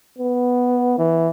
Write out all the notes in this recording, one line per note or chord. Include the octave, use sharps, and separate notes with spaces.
B3
E3